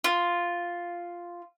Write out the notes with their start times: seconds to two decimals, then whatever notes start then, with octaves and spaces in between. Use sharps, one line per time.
0.04 F4